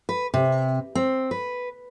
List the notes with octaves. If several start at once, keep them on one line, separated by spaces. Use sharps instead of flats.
B4
C3
C4
B4